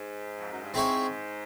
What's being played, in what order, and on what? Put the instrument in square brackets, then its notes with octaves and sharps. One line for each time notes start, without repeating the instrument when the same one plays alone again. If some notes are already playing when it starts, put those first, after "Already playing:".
Already playing: [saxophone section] G#2
F2
F#2
G2
[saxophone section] G#2 [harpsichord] C4 E4 G#4 C#5 E5